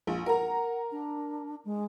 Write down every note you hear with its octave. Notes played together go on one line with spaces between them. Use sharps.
A#1
A#4 F#5 A#5
D4
G#3